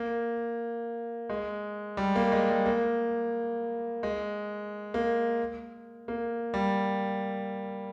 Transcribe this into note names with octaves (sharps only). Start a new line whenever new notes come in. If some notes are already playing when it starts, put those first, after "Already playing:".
Already playing: A#3
G#3
G3
A#3
G#3
G3
A#3
G#3
A#3
A#3
G3